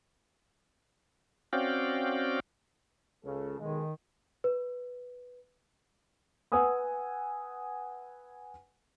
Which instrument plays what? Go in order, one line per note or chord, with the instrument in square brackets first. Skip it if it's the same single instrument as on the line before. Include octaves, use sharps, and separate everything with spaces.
[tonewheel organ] C4 C#4 F#4 D5 F5 G5
[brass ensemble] C#2 C#3 A4
[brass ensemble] B1 G#3 [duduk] D#3
[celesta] B4
[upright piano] B4 F#5 G#5 D#6 E6